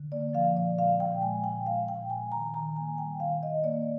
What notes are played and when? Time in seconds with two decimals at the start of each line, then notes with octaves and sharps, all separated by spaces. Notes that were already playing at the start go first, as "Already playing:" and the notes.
Already playing: D3
0.12 A#3 D5
0.33 F3 F5
0.56 A#2 D5
0.77 G#3 F5
1.00 A#2 G5
1.22 G#3 G#5
1.44 A#2 G5
1.66 G#3 F5
1.88 A#2 G5
2.10 G#3 G#5
2.32 D#3 A#5
2.54 D#3 A#5
2.76 A#3 G#5
2.98 G3 G5
3.20 D#3 F5
3.42 D#3 D#5
3.64 A#3 D5